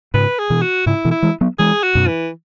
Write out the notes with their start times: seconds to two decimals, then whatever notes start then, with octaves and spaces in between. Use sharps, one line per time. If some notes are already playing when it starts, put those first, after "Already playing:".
0.14 G#2 C#3 B4
0.39 G#4
0.50 B2 E3
0.62 F#4
0.86 G#2 C#3 E4
1.05 B2 E3
1.11 E4
1.23 E3 G#3
1.41 F#3 B3
1.59 E3 G#3 G#4
1.83 F#4
1.95 F#2 B2
2.07 E3